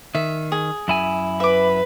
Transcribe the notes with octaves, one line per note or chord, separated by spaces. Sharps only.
D#3 E5
G#4
F#2 E4 G#5
B4 E5 D6